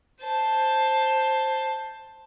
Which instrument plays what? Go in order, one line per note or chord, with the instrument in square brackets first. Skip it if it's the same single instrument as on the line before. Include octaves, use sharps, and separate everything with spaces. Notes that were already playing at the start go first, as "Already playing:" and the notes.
[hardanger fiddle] C5 A5